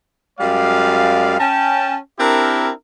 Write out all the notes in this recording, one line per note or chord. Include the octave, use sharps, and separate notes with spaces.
F#2 G3 G#3 D5 F5
C#4 G5 A5
C4 D4 E4 G4 A#4